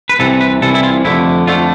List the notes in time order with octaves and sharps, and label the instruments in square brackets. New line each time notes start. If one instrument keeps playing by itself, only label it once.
[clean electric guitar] B4
C2 C3 E3 A4
B4
C2 C3 E3 A4
E4
F4
F2 D3 A3 E4
F2 D3 A3 F4